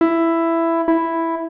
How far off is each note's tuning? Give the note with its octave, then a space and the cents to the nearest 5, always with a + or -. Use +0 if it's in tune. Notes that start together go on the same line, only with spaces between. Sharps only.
E4 +10
E4 +0